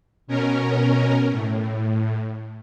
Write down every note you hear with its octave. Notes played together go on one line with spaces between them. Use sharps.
B2 C#4 A#4
A2